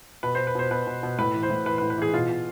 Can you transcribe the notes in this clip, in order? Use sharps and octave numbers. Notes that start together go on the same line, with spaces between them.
B2 B4
B2 C5
B4
B2 C5
B2 B4
B2
B2
A2 B4
E3
C5
A2
E3 B4
B4
A2
B4
E3 G#4
B2 F4
B2